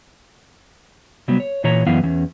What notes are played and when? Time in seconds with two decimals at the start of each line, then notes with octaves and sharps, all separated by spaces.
1.28 C3 F#3 G3 B3
1.40 C#5
1.64 A#2 E3 C#5 A#5
1.86 F#2 E3 B3 E4 F5
2.03 E2 E3 C#4